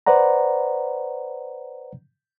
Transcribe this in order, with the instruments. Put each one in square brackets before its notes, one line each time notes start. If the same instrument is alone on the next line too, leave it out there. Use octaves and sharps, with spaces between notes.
[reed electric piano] B4 C5 D5 F#5 A#5